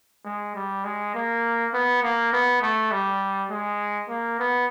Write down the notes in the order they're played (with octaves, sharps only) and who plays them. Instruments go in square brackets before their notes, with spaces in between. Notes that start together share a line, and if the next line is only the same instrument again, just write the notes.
[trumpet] G#3
G3
G#3
A#3
B3
A#3
B3
A3
G3
G#3
A#3
B3